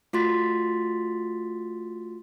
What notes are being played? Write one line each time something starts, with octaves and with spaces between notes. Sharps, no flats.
A3 F4 F#4 C6 A6 B6